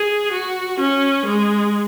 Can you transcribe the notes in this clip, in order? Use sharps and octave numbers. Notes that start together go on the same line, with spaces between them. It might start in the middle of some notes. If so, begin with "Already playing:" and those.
Already playing: G#4
F#4
C#4
G#3